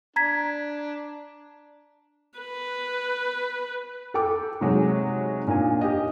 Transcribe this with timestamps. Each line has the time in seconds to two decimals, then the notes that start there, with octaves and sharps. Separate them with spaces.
0.16 D4 A#5 G#6 B6
2.39 B4
4.14 A4 G5 D6
4.61 C3 F#3 G#3 D#4
5.48 A#2 D4 D#4 G#5
5.81 G4 D#5